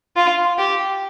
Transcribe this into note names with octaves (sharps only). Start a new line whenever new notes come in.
F4
G4